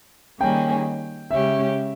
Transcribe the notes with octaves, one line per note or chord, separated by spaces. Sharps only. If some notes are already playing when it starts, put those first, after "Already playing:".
D#3 G3 A#3 C#4 G#4 G5
C#3 G#3 C#4 G4 C#5 E5